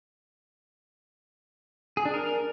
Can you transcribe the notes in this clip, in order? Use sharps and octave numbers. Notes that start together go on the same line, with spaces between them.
G#4
D4
A#4